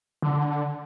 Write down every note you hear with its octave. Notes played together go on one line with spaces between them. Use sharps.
D3